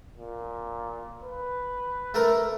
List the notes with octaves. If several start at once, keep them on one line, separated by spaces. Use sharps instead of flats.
A#2
B4
A3 A#4